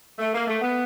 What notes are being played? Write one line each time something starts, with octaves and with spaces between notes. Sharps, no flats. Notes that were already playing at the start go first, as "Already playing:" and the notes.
A3
A#3
A3
B3